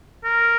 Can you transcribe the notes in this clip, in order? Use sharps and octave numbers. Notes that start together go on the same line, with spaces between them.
A#4